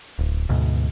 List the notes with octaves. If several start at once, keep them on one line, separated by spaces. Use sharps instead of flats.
D1
D2 G#2 B2